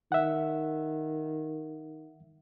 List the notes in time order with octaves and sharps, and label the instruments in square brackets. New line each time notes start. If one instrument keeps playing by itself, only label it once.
[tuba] D#3 [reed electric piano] E5 F#5